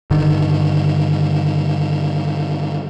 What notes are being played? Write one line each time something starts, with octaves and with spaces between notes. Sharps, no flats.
G2 D3 D#3